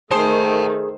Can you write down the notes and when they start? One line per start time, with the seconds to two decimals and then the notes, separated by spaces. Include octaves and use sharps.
0.11 D#3 A3 G#4 C5 G5 A5